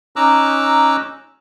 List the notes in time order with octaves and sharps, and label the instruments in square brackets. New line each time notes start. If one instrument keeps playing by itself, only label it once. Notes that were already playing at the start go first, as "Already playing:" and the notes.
[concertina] C#4 D#4 A#5 D6 E6 F#6